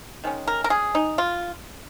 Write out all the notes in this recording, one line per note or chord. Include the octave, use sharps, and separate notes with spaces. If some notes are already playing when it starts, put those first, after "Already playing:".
D#3 G#3 C#4
A#4
A#4
G#4
D#4
F4